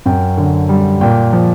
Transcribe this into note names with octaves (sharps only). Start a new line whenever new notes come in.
F#2 G5
D3
G3
A#2 G5
F3